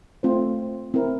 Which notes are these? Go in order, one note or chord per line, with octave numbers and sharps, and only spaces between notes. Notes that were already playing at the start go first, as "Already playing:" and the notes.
A3 C4 F4 C5
C4 E4 A#4